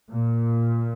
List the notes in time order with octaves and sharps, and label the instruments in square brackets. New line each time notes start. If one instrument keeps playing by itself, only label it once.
[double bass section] A#2